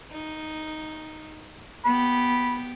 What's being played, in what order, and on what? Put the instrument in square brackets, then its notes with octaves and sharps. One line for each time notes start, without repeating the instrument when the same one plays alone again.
[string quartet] D#4
[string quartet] B3 G4 [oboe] B5